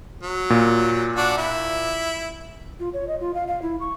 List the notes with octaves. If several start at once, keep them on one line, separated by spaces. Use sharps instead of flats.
F#3
A#2
D4 F#4
E4
F4
C#5
D#5
F4
F5
F5
E4
C#6